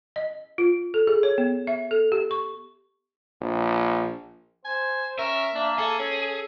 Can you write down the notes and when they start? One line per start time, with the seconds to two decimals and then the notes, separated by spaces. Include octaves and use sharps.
0.16 D#5
0.58 F4
0.94 A4
1.07 G#4
1.23 C#5
1.38 B3
1.67 E5
1.91 A4
2.12 G4
2.31 C#6
3.41 A#1
4.65 C5 G#5
5.19 C#4 A#4 E5
5.55 A#3 D4
5.78 G#4 A4
5.99 C#4 A4